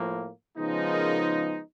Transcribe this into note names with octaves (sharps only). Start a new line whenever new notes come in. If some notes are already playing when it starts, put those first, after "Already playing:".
Already playing: A2 F3 A#3
C#3 F3 G#3 B3 D#4
G#4 A#4